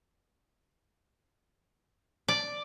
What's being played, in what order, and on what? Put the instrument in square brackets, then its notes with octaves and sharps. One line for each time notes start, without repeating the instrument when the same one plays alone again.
[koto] D5